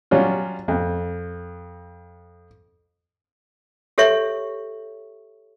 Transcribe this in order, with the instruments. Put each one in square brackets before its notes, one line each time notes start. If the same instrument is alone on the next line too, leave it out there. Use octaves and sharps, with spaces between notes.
[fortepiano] F#3 G3 C#4 F4
F2
[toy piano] G4 A4 C#5 E5 C#6